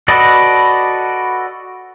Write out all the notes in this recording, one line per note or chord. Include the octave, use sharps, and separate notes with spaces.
F#4 A4 B4 D5 D#5